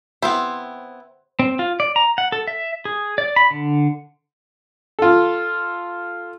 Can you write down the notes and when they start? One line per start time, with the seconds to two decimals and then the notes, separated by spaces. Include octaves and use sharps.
0.22 B3 C4 E4 C5
1.39 C4
1.59 F4
1.80 D5
1.96 A#5
2.18 F#5
2.32 A4
2.47 E5
2.85 G#4
3.18 D5
3.36 B5
3.51 D3
4.99 F4 A4